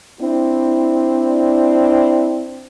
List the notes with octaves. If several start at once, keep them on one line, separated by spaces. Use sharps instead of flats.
C4 D4 E4